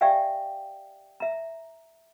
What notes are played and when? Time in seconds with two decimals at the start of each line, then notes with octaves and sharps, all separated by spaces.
0.01 G4 D5 E5 F5 G5 G#5
1.20 E5 A#5